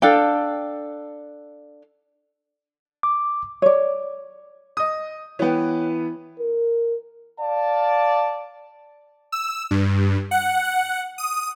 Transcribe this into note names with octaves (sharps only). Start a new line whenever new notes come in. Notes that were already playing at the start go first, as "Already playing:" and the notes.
D4 A4 F5 G5
D6
C#5 D5
D#5 D#6
E3 B3 C#5 G5
A#4
D5 F5 A5
E6
G2
F#5
F#5
D#6